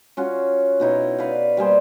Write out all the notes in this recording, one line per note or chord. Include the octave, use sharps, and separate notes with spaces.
C#4 F4 F#4
B2 D#4 E4 C#5
B4 D5 F5
G3 A#3 G#4 C5